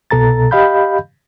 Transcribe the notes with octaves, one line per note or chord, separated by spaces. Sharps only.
C2 B2 A4 A#5 A6
G4 D#5 F5 B5 G6